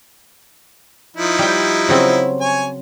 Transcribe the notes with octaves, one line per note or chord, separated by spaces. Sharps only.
F3 D#4 E4
G3 G5
C#3 F#3 C4
C#5 G#5